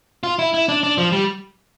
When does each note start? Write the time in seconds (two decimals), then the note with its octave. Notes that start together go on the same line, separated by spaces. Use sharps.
0.23 F4
0.39 E4
0.54 E4
0.69 D4
0.83 D4
0.98 F3
1.12 G3